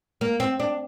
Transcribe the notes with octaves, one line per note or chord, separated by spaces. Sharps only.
A#3
C4
D4